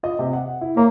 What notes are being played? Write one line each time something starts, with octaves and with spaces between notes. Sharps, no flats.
F4 D#5
C3
F#5
E4
A#3 C#5 A#5